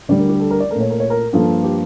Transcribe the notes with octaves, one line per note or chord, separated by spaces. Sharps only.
D2 D3 G3 D5
A#4
G4
A4
A#4
D5
A#2 A3 A#4
C#5
A#4
C#5
A#4
G2 F3 A#3 A4
G4